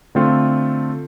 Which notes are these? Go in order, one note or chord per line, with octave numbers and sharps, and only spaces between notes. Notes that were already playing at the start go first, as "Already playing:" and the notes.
D3 A3 C4 F4 A4